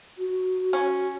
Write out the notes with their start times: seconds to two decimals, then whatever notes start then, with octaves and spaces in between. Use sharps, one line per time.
0.18 F#4
0.73 C#4